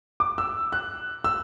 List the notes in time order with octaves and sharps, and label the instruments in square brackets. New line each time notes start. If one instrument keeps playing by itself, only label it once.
[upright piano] D6
E6
F#6
E6